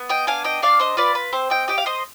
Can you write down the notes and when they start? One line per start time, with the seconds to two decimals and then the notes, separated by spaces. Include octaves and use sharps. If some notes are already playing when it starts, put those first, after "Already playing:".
Already playing: B3
0.09 D#5 G5
0.27 D4 F5 G#5
0.44 D#5 G5
0.62 D4 D5 F5
0.80 C5 D#5
0.97 F4 B4 D5
1.15 B4
1.33 C4 C5
1.50 D#5 G5
1.68 G4 D#5 G5
1.78 F5
1.86 C5 D#5